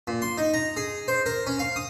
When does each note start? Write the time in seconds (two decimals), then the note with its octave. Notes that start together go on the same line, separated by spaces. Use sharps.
0.07 A#2
0.22 C6
0.38 D#4
0.54 A#5
0.77 G#4
1.08 C5
1.26 A#4
1.47 C#4
1.59 F5
1.76 D#6